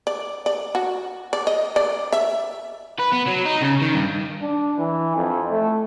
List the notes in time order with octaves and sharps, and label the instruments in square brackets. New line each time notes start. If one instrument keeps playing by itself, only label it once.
[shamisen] D5
D5
F#4
D5
D#5
D5
E5
[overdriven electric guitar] B4
B3
F#3
D#4
C#3
D#3
G2
[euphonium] D4
E3
F2
A3